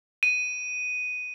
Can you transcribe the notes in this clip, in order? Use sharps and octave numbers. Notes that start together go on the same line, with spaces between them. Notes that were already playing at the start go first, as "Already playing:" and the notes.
D#7